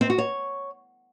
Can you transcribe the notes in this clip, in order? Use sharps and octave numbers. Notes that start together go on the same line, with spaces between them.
C4
F#4
C#5